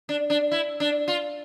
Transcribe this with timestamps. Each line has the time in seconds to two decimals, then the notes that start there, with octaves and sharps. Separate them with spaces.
0.09 D4
0.30 D4
0.52 E4
0.80 D4
1.08 F4